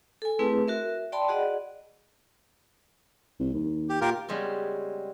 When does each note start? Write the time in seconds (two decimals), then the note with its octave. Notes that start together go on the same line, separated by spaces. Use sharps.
0.22 A4 G#5
0.39 A3 C4 E4 G#4 B4
0.68 F#4 A#4 E5
1.12 D5 G5 A5 B5 C6
1.28 F#4 G#4 D5 D#5 F#5
3.40 C2
3.54 D#2
3.89 G4
4.01 A#2 F4 G4 A#4
4.28 C#3 G3 G#3 B3 C4